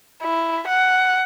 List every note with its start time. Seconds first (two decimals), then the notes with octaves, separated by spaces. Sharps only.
0.23 E4
0.68 F#5